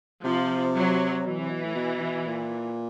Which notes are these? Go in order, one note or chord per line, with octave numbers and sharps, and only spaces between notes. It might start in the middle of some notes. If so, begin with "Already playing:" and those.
C3 F3
F#3
B2 E3
C3
B2
A2
B2
B2
A#2